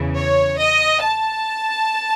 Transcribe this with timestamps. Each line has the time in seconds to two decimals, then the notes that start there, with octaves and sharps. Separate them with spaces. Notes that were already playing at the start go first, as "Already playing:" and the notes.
Already playing: E2 C#3 E3
0.17 C#5
0.58 D#5
1.01 A5